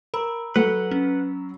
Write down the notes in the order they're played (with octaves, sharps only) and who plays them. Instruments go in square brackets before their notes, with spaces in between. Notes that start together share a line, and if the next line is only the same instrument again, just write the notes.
[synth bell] A#4 [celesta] A#5 B5 E6
[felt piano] F#3 [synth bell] A4 [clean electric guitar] B4 F#5
[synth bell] C#4